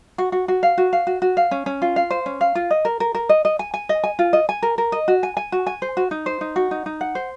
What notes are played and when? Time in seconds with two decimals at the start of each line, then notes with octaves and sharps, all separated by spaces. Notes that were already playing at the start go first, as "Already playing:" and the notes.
0.18 F#4
0.32 F#4
0.48 F#4
0.63 F5
0.78 F#4
0.93 F5
1.07 F#4
1.22 F#4
1.37 F5
1.51 C#4
1.66 C#4
1.82 F4
1.96 F5
2.10 C5
2.26 C#4
2.41 F5
2.55 F4
2.71 D#5
2.85 A#4
3.00 A#4
3.15 A#4
3.29 D#5
3.45 D#5
3.59 G#5
3.74 G#5
3.89 D#5
4.04 G#5
4.19 F4
4.33 D#5
4.49 G#5
4.62 A#4
4.78 A#4
4.92 D#5
5.08 F#4
5.23 G#5
5.37 G#5
5.52 F#4
5.67 G#5
5.82 C5
5.97 F#4
6.11 D#4
6.26 C5
6.41 D#4
6.56 F#4
6.71 D#4
6.86 D#4
7.01 F#5
7.15 C5